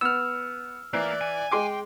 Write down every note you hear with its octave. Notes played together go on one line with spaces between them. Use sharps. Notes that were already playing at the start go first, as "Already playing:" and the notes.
B3 E6 F6
E3 A#3 D5
G#5
G#3 G5 C6 D6